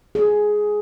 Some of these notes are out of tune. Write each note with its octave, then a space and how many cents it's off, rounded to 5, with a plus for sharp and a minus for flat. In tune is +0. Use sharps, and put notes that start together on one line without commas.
G#4 +10